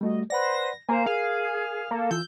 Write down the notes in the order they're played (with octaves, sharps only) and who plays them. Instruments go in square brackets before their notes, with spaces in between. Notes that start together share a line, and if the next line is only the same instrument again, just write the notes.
[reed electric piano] G3 A3 F#4 [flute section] D#5
[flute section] B4 C5 [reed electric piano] D5 F#5 B5 [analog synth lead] A#6
[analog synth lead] A#3 [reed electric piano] A#4 G#5 [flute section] C5 A#5
[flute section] G#4 [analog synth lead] F5
[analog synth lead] A#3 [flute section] A4
[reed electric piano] E3 F4 E6 [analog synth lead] G6